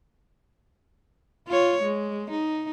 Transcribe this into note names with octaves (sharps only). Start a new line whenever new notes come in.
F4 C#5
G#3
D#4